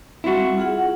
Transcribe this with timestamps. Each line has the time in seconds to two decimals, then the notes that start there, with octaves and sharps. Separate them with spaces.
0.24 G3 C4 E4 F#4
0.58 F4 G#4 F#5